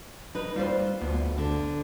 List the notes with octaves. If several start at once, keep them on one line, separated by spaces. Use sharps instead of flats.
D#4 B4
G3 F4 C5
D2 B3
D3